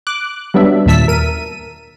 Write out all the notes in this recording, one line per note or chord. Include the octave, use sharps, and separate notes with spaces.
D6 F#6
F#3 G3 B3 D4 E5
D#2 A#2 E5 A5 E6 B6
A#4 D#7